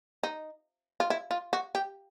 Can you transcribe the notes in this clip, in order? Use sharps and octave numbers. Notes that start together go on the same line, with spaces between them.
D#4
F4
E4
F4
F#4
G4